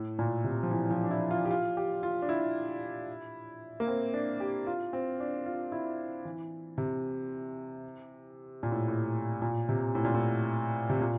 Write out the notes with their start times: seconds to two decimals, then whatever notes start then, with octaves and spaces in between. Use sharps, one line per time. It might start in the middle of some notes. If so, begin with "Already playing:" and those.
Already playing: A2
0.19 A#2
0.44 C3
0.63 F3
0.70 E3
0.91 F3
1.04 D4
1.11 E4
1.31 F4
1.45 G4
1.51 F4
1.77 G4
2.03 F4
2.22 D4
2.29 E4
3.80 A#3
3.88 C4
4.14 D4
4.40 G4
4.67 F4
4.93 C4
5.20 D4
5.46 F4
5.72 E4
6.25 E3
6.78 C3
8.63 A#2
8.72 A2
8.88 A2
9.42 A#2
9.69 C3
9.95 A2
10.05 A#2
10.14 A2
10.90 C3
11.01 A#2